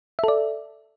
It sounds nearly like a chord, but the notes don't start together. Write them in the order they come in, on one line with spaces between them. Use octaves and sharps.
E5 A4 D5